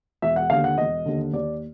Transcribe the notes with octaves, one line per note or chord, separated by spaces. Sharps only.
E1 E5
F#5
D#2 D3 F5
F#5
E1 D#5
D#2 D3
D#2 D5